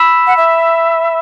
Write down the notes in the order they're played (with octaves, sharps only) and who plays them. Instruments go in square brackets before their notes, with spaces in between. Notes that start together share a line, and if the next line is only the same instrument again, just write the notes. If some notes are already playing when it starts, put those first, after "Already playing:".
Already playing: [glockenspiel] B5 E6 B6 E7
[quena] F#5
E5